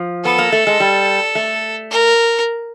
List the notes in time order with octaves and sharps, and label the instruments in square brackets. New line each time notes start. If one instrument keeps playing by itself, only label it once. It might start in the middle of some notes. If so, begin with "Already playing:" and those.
Already playing: [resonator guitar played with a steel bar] F3
[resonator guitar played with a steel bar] B3 [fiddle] A4
[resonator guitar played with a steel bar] A#3
A3
G#3
G3
A3
[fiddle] A#4